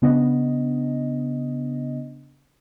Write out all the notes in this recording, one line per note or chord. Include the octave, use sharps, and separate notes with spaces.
C#3 B3 D4 D#5